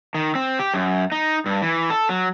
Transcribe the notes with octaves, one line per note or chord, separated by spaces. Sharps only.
D#3
C4
G4
F#2
D#4
G2
E3
A4
F#3